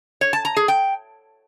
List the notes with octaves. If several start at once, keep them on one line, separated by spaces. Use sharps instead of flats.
C#5
A5
A#5
G#4
G5